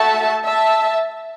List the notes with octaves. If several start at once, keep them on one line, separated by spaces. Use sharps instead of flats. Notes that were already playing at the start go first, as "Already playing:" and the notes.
Already playing: A3 F#4 A4 E5 A5
E5 A5